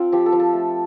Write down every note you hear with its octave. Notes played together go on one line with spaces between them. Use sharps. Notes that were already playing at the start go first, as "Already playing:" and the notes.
Already playing: C4 F4 A4
F3 G4
A4
F3
A4
A3